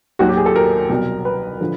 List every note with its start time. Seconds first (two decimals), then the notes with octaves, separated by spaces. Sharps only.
0.19 D#2 D#3 F#3 F#4
0.29 G4
0.37 G#4
0.46 A4
0.56 A#4
0.90 C2 B2 F#3
1.25 B4
1.61 D3 F3